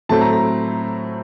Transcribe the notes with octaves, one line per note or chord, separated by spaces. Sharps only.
A2 F#3 A3 C4 A5
A#5
A#5